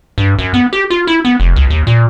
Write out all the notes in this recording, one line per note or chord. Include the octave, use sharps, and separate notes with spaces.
G2
F#2
B3
G4
F4
E4
B3
F1
C#2
D#2
A#2